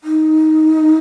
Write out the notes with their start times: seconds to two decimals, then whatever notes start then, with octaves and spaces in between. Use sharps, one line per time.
0.04 D#4